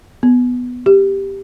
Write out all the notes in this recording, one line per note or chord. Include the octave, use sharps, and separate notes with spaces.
B3
G4